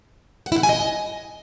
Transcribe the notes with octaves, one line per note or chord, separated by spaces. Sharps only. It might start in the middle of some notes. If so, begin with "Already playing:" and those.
F#5
E4
F#5
G#5
D#5